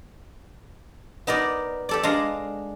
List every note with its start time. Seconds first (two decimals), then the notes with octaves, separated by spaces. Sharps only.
1.27 B3 D#4 A#4 D5
1.89 G4 A4 D5
2.03 G#3 D4 F5 A#5